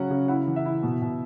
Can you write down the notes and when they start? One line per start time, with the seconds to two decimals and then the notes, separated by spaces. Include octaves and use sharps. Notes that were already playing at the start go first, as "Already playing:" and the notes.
Already playing: C#3 F#3 C#4 F#5
0.10 C#3
0.28 E4 F#5
0.48 E3
0.56 E5
0.66 E4
0.83 B2
1.02 B2